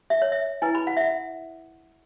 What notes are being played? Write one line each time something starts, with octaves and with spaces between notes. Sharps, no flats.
E5
C#5
E5
E4 B4 G#5
B5
F#5
E5
F#5